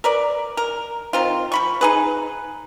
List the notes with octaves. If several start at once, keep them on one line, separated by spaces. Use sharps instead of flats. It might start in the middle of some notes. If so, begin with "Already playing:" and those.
A#4 B4 D5
A#4
D#3 C4 F4
F3 B5 C#6
D#4 G#4 B4